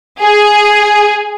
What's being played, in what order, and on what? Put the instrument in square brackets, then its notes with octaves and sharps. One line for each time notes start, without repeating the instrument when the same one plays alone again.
[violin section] G#4